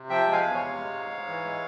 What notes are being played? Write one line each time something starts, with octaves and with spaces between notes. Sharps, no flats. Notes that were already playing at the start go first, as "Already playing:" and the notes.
Already playing: C3
F3 E5 G5
G#3
F5 G#5
E2
C#5 F5
C3
G#3
G#2
G#2
E3
G#3